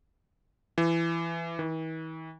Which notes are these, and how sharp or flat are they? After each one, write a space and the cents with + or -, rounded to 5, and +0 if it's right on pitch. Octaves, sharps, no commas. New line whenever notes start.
E3 +20
E3 -45